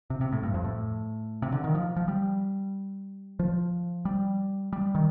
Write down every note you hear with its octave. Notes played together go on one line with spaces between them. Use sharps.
C3
C3
A2
G2
F2
A2
C3
D3
D#3
F3
F3
G3
F3
G3
G3
D#3